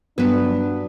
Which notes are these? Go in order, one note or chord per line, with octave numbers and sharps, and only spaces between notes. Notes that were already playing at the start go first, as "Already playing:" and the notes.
G2 A#2 F#3 B3 D4 B4